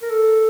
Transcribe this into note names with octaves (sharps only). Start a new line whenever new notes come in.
A#4
A4